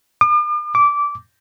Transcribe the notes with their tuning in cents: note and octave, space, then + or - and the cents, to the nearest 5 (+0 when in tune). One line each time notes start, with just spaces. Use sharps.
D6 +45
D6 -15